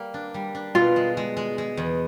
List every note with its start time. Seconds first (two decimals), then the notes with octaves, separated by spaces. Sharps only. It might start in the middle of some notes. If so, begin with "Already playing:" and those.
Already playing: G3 A#3
0.14 D4
0.34 G3
0.55 D4
0.75 B2 F4
0.96 G#3
1.17 G#3
1.37 G#3
1.58 G#3
1.77 E2